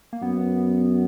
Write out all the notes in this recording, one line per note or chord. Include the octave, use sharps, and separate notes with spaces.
A#3
F#2 B3